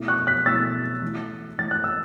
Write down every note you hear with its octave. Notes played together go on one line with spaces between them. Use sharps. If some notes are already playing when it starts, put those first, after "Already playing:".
Already playing: B2 A3 E4
C#6 F#6
F#6 B6
B2 A3 E4 E6 A6
E3 A3 E4
E3 A3 E4 A6
F#6
E6